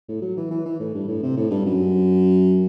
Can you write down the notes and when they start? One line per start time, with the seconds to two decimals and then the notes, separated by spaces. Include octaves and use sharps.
0.09 A2
0.22 F#3
0.37 E3
0.51 E3
0.66 E3
0.80 A2
0.95 G2
1.08 A2
1.23 C3
1.37 A2
1.51 G2
1.66 F#2